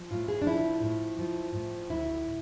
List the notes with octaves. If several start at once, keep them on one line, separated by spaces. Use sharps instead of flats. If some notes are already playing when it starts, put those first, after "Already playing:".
Already playing: F3
A2 F4
G#4
D4
F3 E4
A2
F3
A2
D2 E4